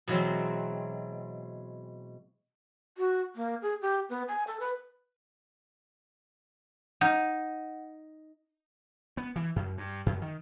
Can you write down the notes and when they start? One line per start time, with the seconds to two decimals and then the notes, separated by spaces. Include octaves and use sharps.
0.08 B2 E3 F#3 G#3 C4
2.98 F#4
3.35 A#3
3.62 G#4
3.82 G4
4.09 B3
4.28 G#5
4.47 A4
4.60 B4
7.01 D#4 F#5
9.17 B3
9.36 E3
9.56 F#2
9.78 G2
10.06 F#2
10.22 D#3